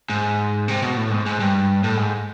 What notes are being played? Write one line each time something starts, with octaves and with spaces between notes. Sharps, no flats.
G#2
C3
B2
A2
G#2
G#2
G2
A2
G#2